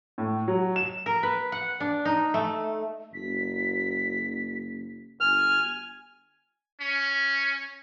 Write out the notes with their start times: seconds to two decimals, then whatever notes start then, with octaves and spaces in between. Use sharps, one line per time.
0.18 A2
0.48 F#3
0.76 E7
1.06 A#4
1.23 B4
1.52 F#5
1.80 D4
2.05 D#4
2.34 A3
3.14 F#1 B6
5.21 G1 G#5 F6
6.81 C#4